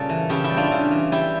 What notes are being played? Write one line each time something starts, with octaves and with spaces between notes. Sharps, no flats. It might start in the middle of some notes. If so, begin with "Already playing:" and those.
Already playing: A#2 C#3 G3 A4
E3
C#3 E4 G4
E4 G4
G3
D4 F4
C#3
E3
G3 E4 G4